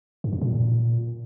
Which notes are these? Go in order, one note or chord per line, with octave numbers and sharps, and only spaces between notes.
G2
F2
A#2